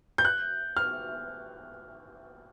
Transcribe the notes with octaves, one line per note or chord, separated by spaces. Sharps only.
G6
F#6
F6